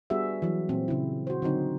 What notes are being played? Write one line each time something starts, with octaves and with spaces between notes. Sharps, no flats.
G3 B3 D4 F#4 G#4 E5
E3 F#3
A#2 C4
C#3 E4
F#4 C5
D3 F#3 C4 D#4